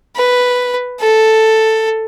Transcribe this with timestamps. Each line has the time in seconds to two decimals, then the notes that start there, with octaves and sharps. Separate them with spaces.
0.16 B4
1.00 A4